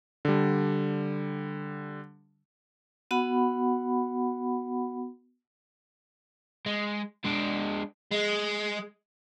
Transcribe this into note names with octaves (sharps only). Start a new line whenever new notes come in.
D3 G3
B3 F#4 F#5 B5
G#3
G#3 D4
G#3